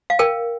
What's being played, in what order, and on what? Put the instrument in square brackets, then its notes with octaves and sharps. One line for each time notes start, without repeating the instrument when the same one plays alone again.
[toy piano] F5
A#4 G5